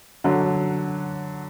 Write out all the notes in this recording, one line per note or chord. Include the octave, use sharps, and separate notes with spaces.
D3 F#3